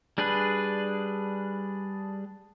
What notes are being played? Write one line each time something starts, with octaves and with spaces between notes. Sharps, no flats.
G3 D4 G#4 B4